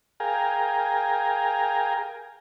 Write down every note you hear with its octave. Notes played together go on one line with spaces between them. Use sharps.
G#4 A#4 F5 G5 G#5 A#5